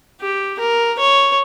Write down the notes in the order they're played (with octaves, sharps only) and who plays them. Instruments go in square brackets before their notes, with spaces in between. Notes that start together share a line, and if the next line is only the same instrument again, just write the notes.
[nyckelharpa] G4
A#4
C#5